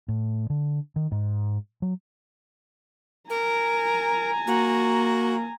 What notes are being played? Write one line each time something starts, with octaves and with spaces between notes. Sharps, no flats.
A2
D3
D#3
G#2
F#3
A#4 G#5 A#5
A#3 F#4